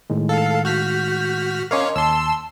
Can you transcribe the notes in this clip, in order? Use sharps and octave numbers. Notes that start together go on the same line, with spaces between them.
A2 D#3 G#3
A4 F5
F#4 F6 G6 B6
C#4 A#4 C#5 D#5 F5 C6 D6
D#2 A5 C6 E6